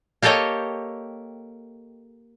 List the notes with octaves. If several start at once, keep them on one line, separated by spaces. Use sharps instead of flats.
A#3 G4 A4 C#5 D#5 G5